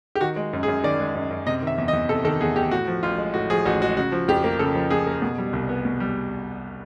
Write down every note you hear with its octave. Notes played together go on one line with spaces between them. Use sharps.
G4
D#3 F#4
G#3
F#2
G#4
F#2
D#3 D5
G#3
F#2
F#2
C3 D#5
D#3 E5
E2
D#5
E2
C3 A4
D#3 A4
E2 G#4
E2 G4
A2 F#4
F3
A1 F4
G#3
A2 F#4
F3 G#4
A1 F#4
G#3 F#4
C#3 F#4
F3
F2 G4
A#3
C#3 A4
F3
F2 G#4
A#3
B2
G3
C2
B3
B2
G3